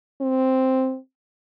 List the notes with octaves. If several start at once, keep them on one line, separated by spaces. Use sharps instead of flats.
C4